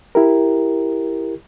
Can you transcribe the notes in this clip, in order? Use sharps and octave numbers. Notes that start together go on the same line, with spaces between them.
E4 G4 A#4